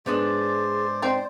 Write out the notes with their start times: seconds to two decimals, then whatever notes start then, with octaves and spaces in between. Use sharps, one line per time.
0.06 G#2 B3 D4 G#4 C5 D5
1.02 C4 D#4 C5 D5